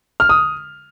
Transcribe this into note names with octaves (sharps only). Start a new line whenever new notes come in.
F6
D#6